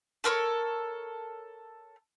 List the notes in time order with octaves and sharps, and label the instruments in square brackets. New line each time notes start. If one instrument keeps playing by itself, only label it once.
[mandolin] A4 A#4 C5 C#5